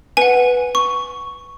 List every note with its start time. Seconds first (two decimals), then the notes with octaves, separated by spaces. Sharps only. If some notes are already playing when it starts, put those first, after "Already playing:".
0.17 B4 F#5 G#5
0.75 C#6